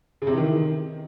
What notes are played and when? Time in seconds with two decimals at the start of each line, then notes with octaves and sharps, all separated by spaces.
0.22 C#3
0.27 C3
0.32 E3
0.37 D#3